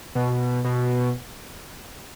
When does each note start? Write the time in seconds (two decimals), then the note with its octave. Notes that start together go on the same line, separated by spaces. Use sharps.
0.15 B2
0.64 B2